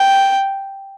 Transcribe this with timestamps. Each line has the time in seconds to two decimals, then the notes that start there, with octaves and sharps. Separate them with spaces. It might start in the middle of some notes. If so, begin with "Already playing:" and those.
Already playing: G5